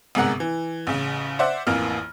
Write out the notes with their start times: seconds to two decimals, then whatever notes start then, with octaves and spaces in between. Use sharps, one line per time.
0.15 G1 G#2 C3 G#4 A#4 F#5
0.40 E3
0.87 A1 C#3
1.39 C5 D5 E5 F#5
1.67 A1 F2 E3 A#3 F6